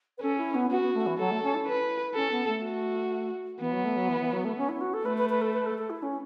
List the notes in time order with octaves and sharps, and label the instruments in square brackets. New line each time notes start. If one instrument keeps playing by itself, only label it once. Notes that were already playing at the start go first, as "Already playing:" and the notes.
[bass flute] B4
[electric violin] C#4 [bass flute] A4
[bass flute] E4
B3
[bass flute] B3 [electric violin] F#4
[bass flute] B3
A3
E3
[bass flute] F#3 [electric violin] A4
[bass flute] A3
C#4
E4
[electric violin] B4
[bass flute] C#4 [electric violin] A4
[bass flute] B3
A3
[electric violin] F#4
[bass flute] E3 [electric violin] B3
[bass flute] F#3
A3
F#3
E3
E3
F#3
A3
C#4
E4
F#4
A4
[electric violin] A3 [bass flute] B4
[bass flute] B4
B4
A4
B4
A4
A4
E4
C#4